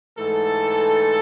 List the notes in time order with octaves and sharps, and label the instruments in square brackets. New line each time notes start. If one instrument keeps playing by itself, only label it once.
[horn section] G#2 E3 A3 A4